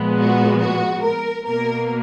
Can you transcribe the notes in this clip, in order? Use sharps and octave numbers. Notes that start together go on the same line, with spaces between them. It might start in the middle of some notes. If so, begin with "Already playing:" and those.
Already playing: A#2 F3 G#3 B3
F#4
F#4
A#4
B2 A#3 A#4